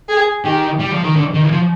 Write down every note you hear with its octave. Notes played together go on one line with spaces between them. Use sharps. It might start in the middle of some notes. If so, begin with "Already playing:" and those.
G#4
D#3 G4
G3
F3
D#3
D3
D#3
F3